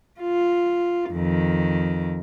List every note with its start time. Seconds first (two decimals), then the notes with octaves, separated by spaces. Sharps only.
0.20 F4
1.11 F2 D#3